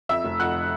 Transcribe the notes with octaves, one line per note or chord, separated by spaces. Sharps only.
F2 E5 E6
F1
F2 F#5 F#6